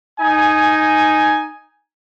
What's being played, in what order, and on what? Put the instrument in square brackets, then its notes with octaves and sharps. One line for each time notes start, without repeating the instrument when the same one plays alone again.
[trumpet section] D#4 G#5